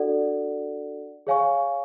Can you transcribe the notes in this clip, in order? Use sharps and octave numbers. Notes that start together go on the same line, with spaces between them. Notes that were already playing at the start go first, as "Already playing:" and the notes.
Already playing: D4 F#4 A4 D5 F#5
G#4 C#5 F5 G#5 C#6